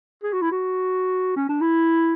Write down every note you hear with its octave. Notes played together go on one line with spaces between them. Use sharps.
G#4
F#4
E4
F#4
C#4
D4
E4